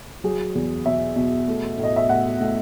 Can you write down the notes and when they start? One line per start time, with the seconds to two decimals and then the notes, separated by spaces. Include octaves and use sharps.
0.24 F#3 G#4
0.55 E2
0.86 B2 E5
1.16 B2
1.48 A3
1.78 A2
1.83 D#5
1.96 E5
2.09 A2 F#5
2.41 A2